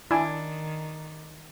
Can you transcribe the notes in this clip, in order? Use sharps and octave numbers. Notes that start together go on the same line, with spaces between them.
D#3 D4 E4 G#5